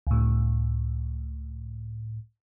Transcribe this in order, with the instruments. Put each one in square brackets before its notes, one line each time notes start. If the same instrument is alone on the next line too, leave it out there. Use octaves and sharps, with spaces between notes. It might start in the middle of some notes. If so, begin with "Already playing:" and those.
[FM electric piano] C#2 A2